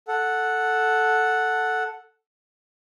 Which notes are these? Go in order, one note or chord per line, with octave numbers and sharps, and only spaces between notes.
A4 F#5